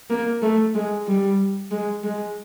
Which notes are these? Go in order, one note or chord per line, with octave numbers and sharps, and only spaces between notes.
A#3
A3
G#3
G3
G#3
G#3